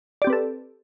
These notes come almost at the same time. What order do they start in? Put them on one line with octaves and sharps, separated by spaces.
D5 G4 C4 B4 A4